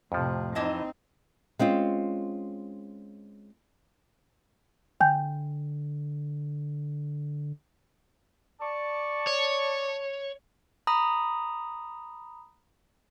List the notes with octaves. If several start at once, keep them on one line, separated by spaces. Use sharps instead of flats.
F2 A2 C3 F3
E3 C4 D#4 D#5 A5
G#3 C4 C#4 F4
D3 G5 G#5 G6
D5 A5 C#6
C#5
A#5 B5 D#6